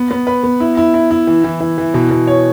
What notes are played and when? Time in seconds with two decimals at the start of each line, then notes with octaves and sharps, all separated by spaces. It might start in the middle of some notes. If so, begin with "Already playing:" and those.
Already playing: B3
0.11 B3
0.27 B4
0.44 B3
0.60 E4
0.77 E4
0.94 E4
1.11 E4
1.27 E3
1.44 E3
1.60 E3
1.78 E3
1.94 B2
2.11 B2
2.27 C#5